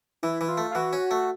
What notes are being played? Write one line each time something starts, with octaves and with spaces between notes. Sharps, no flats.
E3 E4
E3
F4
A3
F4
E3 F#4
C#4
A3